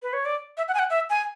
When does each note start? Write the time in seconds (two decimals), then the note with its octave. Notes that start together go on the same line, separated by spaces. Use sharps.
0.03 B4
0.13 C#5
0.25 D5
0.58 E5
0.68 F#5
0.74 G#5
0.79 F#5
0.90 E5
1.10 G#5